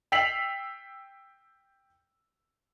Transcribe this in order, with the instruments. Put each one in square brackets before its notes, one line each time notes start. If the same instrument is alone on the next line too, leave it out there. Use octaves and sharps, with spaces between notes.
[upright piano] G5 E6 B6 C7 F7 F#7